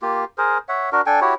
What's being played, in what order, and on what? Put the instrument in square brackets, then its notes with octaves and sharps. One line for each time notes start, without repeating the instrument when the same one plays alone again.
[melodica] A#3 F4 G4
G#4 A#4 C5
C#5 E5 F#5
D4 F#4 A#4
D4 A4 G5 G#5
E4 F#4 G4 C#5